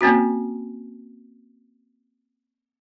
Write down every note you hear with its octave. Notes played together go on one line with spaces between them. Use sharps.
A#3 C4 C#4 F#4